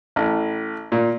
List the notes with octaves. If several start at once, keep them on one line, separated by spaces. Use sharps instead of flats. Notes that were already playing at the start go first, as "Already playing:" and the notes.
A1
A#2